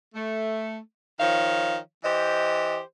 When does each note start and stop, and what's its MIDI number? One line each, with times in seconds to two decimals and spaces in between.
0.15 0.79 57
1.20 1.78 51
1.20 1.78 53
1.20 1.78 73
1.20 1.78 77
2.04 2.79 52
2.04 2.79 67
2.04 2.79 72
2.04 2.79 75